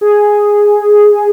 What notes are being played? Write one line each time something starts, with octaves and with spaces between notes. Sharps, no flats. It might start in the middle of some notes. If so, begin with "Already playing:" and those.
G#4